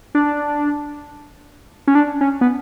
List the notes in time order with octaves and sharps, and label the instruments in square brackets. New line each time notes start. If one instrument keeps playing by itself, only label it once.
[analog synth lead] D4
C#4
D4
C#4
B3